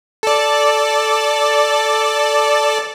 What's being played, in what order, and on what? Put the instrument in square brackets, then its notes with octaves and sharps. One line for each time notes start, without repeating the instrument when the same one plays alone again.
[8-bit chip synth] A4 D5